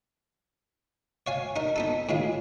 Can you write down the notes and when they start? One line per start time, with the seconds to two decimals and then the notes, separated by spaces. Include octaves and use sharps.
1.27 C#5 F5 G#5
1.56 D#4 A#4
1.76 B3 D#4 A4
2.09 A2 D#3 G#3 F4